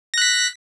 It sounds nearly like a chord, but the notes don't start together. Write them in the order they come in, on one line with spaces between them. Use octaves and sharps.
A#6 F#6 B6